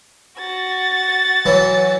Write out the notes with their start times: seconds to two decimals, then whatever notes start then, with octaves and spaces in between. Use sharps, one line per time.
0.38 F#4 A6
1.45 E3 F#3